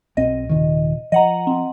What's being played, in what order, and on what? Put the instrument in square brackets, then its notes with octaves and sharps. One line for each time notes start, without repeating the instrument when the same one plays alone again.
[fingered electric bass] B1 C4 [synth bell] D#5
[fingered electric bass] D#1 C3 D#3
[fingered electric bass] F3 [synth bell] D#5 F#5 A#5
[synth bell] C4